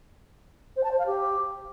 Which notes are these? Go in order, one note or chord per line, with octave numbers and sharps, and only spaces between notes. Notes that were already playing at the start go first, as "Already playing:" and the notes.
C5
A5
C5
F5
G4